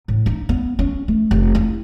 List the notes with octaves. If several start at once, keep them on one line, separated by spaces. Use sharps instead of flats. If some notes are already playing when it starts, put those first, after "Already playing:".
A2
D#4
B3
C#4
A3
F1
E4